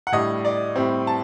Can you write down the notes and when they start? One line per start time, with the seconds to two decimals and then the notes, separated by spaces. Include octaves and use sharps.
0.07 F#5
0.12 A2 G3 D4 D#5
0.45 D5
0.76 A2 G3 C4
1.07 A5